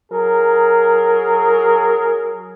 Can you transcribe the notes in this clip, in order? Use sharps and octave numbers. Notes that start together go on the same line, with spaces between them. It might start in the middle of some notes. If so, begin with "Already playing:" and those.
F#3 G#4 A#4